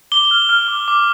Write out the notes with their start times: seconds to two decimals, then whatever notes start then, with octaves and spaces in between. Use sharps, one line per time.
0.12 D6 G7
0.31 F6
0.49 F6
0.68 D6
0.88 D6